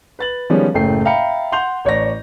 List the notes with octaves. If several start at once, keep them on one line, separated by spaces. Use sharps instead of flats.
B4 A6 F#7
D#3 F3 G3 G#3 B3 C#4
F#1 A2 C#3 A3 G5 C7
E5 F5 G5 A#5 B5 C#7
F#5 C6 G6 F7
A1 C#5 D5 A#6